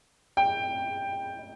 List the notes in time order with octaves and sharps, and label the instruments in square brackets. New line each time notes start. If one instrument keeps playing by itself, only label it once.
[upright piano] G5